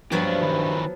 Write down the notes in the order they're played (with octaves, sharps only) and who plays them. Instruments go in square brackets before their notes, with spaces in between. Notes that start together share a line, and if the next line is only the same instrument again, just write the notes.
[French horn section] G2 [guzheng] F3 F#3 B3 [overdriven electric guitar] G4 C#5
[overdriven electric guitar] D#3 E4